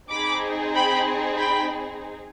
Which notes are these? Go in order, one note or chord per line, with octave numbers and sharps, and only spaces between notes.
C4 D#4 G#4 B5 D6
G5 B5
G5 B5